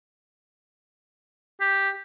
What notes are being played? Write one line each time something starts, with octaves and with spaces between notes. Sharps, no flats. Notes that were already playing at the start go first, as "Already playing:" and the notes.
G4